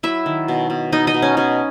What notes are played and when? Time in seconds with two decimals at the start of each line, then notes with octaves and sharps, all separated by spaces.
0.03 F#3 E4 E5
0.26 D#3
0.48 B2
0.70 B2
0.92 B2 D#4 D#5
1.07 D#4 D#5
1.14 B2
1.22 C#4 C#5
1.37 B2 C#4 C#5